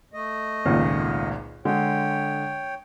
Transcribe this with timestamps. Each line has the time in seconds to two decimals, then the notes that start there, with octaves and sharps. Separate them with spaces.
0.14 A3 D#5
0.66 G#1 C#2 A#2
1.65 D3 G#3 C#5 G5